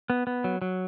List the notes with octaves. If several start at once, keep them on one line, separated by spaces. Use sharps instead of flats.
B3
B3
F#3
F#3